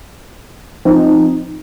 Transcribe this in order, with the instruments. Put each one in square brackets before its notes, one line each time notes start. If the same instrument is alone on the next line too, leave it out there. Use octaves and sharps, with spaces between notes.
[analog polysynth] F3 C4 D#4